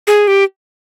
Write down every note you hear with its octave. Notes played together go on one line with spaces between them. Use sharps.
G#4
G4